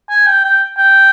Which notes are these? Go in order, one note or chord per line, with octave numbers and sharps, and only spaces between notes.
G#5
G5
G5
G5